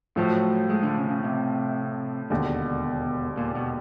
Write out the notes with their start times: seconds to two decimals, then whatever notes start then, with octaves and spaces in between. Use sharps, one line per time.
0.16 A2 F3 F#3 A3
0.70 G#3
0.83 D3
0.97 C#3
1.10 C#3
1.24 C3
2.30 E1 D#2 B2 D3
3.37 A#2
3.55 B2